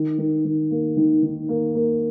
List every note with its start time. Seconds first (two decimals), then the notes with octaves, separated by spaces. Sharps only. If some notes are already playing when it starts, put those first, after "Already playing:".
Already playing: D#3
0.18 D#3
0.45 D#3
0.71 A#3
0.97 D#3
1.22 D#3
1.49 A#3
1.75 A#3